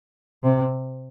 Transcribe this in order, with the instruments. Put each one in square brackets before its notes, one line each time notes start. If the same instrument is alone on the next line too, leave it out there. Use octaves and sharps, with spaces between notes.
[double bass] C3